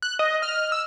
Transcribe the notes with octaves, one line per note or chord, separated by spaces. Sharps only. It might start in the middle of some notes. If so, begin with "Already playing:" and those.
F#6
D#5
F6
E6